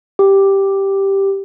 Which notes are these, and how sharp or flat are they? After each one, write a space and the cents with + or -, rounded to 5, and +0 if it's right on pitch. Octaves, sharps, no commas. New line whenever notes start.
G4 +0